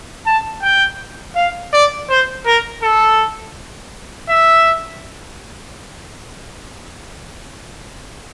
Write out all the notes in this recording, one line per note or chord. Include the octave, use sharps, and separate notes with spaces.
A5
G5
F5
D5
C5
A#4
A4
E5